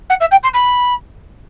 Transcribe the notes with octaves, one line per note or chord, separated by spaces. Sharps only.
F#5
E5
G5
C6
B5